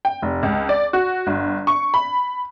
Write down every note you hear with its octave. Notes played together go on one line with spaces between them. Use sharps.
G5
F1
C#2
D5
F#4
G1
C#6
B5